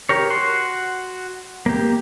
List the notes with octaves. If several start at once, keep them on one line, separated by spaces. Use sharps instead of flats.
G4 A#4 C#5
F#4 F#5 C6
A#3 G4